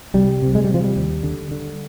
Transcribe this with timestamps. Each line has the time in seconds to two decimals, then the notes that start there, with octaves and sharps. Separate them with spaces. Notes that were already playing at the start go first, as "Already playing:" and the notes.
0.14 C2 G3
0.42 C3
0.55 G#3
0.64 G3
0.69 C3
0.74 F3
0.84 G3
0.96 D#2
1.23 D3
1.51 D3